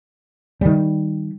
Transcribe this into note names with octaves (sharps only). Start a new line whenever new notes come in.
D#3 G3